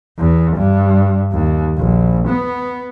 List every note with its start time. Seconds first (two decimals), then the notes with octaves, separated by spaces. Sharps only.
0.18 E2
0.56 G2
1.32 D#2
1.78 A#1
2.28 B3